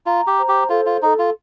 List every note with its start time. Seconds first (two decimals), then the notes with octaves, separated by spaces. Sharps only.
0.06 F4 A#5
0.27 G4
0.38 C5
0.49 G4
0.70 F4 A4
0.86 F4
1.02 D#4 A4
1.19 F4